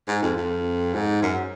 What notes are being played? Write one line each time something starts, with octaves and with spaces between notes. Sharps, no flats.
G#2
F2
F2
G#2
F#2